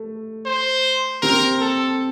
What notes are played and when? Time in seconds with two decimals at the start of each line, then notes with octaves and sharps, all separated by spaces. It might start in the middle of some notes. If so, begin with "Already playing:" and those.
Already playing: A3
0.46 C5
1.22 C4 A#4
1.61 A4